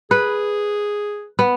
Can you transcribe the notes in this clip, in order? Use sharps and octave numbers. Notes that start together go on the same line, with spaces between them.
G#4 B4
B3